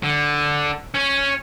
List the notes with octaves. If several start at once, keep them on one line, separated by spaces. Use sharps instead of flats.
D3
C#4 C#5